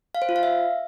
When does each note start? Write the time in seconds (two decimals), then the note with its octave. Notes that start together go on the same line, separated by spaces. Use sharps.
0.15 F5
0.22 C5
0.29 F4
0.36 F5
0.43 E5